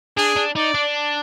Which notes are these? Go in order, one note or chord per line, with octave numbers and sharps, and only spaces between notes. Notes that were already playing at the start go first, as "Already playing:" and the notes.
D4 G#4
D4
D#4 D5
D4